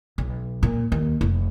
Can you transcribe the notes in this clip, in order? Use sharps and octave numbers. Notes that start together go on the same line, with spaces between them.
B1
A#2
D#2
F1